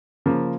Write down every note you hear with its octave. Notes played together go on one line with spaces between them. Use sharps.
C#3 F3 A#3